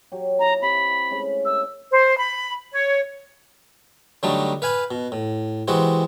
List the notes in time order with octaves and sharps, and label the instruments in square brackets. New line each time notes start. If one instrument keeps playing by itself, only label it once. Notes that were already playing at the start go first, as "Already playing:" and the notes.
[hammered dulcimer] F#3 G4
[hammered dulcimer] E4 D#5 [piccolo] A#5
[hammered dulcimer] C3 [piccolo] B5
[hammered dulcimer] G#3 A3 C#4
[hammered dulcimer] A#4 E5 [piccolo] E6
[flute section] C5
B5
C#5
[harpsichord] D3 F#3 G3 A3 D4 D#4
B4 F5 G#5 B5
B2
A2
C3 E3 G#3 C4 F#4